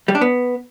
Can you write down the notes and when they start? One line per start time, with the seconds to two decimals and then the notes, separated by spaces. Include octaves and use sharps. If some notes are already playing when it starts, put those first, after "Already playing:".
0.08 G3
0.15 D4
0.21 B3